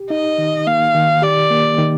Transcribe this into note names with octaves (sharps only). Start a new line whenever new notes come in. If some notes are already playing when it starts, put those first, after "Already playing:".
Already playing: G4
D#4 D#5
D#3
A#3 F5
D#3
G4 D5
A#3
D#3